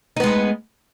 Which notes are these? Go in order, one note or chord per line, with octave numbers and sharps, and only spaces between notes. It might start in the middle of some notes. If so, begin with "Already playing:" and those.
G#3 B3 D#4